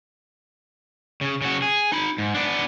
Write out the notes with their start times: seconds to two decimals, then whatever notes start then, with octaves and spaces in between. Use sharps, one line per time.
1.21 C#3
1.42 C#3 F#4
1.62 G#4
1.92 D#4 B5
2.18 G#2
2.34 B3 D4